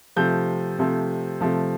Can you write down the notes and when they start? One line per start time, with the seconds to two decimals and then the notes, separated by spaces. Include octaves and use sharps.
0.16 C3 F3 A3 G6
0.79 C3 F3 A3
1.41 C3 F3 A3